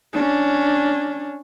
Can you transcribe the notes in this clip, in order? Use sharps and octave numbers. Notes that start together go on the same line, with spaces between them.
C#4 D4